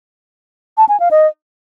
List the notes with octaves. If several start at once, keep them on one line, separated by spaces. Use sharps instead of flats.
A5
G#5
F5
D#5